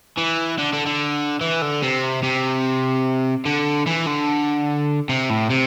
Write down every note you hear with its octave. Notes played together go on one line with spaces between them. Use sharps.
E3
D3
D3
D3
E3
D3
C3
C3
D3
E3
D3
C3
A2
C3